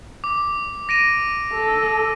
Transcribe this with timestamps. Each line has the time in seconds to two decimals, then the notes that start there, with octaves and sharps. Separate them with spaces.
0.24 D6
0.89 A#6 D7 D#7
1.53 A4